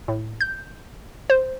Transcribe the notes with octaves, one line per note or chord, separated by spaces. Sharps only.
A2
G6
C5